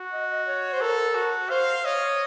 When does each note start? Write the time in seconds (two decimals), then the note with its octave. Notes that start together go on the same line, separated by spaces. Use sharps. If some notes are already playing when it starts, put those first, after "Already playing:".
Already playing: F#4
0.12 D#5
0.30 D#5
0.47 C#5
0.72 C5
0.81 A4 A#4
1.15 F#4
1.50 C5 F5
1.85 C#5 D#5